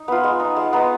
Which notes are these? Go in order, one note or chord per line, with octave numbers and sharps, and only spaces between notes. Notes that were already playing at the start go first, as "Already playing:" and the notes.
Already playing: D#4
B3 F4
G#3
D#4
G#3
B3 D#4